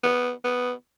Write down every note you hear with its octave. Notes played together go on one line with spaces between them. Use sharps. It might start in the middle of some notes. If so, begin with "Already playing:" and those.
B3
B3